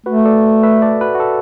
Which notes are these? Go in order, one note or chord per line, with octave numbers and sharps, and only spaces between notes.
A3 F#4 B4
A4 D5
B4 E5
A4 D5
F#4 B4
F#4
A4